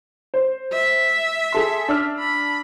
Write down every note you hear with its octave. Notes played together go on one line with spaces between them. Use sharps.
C5
E5
G#4 A4 C6
D4 E6 F6
B5